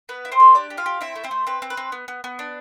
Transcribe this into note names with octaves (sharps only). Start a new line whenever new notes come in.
B3 B4
E4
C4 C5
A4
D4 G4 D5
G4
F4 F5
G4
C4 E4 E5
A3
C4 C5
A3
C4 B4
C4
B4
C4
B3
B3
B3
D4